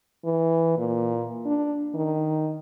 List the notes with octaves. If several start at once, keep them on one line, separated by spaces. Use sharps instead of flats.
E3
A#2
D4
D#3